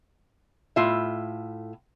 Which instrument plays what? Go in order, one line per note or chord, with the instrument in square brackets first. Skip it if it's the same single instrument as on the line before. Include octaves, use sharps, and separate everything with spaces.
[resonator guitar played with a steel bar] A2 F4 E5